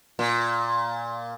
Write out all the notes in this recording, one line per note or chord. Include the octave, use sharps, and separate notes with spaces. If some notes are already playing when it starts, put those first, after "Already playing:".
A#2